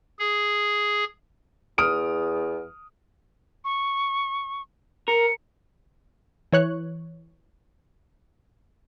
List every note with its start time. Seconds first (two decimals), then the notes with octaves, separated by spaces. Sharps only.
0.19 G#4
1.78 E2 D#6 F6 D7
3.65 C#6
5.08 A#4 C#7
6.52 E3 C#5 F#6